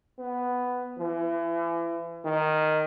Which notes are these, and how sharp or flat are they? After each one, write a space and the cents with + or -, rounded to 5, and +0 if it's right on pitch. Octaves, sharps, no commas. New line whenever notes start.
B3 +5
E3 +35
D#3 -5